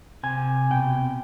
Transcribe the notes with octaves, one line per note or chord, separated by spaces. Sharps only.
C3 G#5
B2 G5